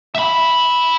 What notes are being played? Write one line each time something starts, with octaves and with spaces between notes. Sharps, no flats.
E5 B5